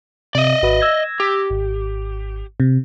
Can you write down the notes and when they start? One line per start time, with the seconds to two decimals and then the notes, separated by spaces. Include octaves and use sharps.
0.35 C3 D5 D#5
0.62 G#1 F#4 B4
0.81 E6 G#6 A#6
1.20 G4
1.50 G#1
2.60 C3